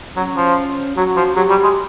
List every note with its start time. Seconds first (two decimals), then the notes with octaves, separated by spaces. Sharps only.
0.16 F#3 C#4
0.36 F3
0.97 F#3 F#4
1.16 F3
1.36 F#3 G4
1.50 G3
1.63 G#3